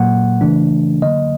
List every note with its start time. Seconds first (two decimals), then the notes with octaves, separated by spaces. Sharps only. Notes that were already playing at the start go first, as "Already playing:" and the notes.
Already playing: A#2 F#3 A#3 F#5
0.41 C#3 E3 A3 D4
1.02 D3 F#3 A#3 D#5